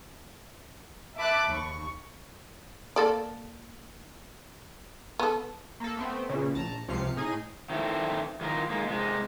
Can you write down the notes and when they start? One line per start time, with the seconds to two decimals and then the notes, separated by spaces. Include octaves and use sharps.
1.16 E5 A5 B5 D6 F#6 A6
1.50 D#2 C#6
2.96 A#3 A4 D5
5.19 B3 A4
5.80 A#3 A4
5.97 A3 B3 C4
6.29 A#2 C#3 E3
6.54 A#1 A5 A#5
6.88 C#2 C3 F3 F5 C7 C#7
7.17 A2 D#4 G#4 D#7
7.70 D#3 E3 C4 E4 A4
8.41 D#3 E3 F4 A#4
8.70 D#3 G#3 A#3
8.88 C3 G#3